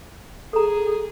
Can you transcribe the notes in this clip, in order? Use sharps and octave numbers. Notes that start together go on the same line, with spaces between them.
G#4 A4 A#5